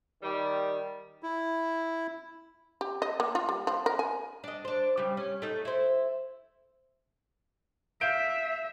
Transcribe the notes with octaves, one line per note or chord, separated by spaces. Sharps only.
D#3 G3
E4
G4
D#5
A#3
F4
G3
F3
A#4
G#5
D4 D#5
D4 C5
C#3 G3
C#4
A3 D#4
E4 C5
E5 F5 G6 D7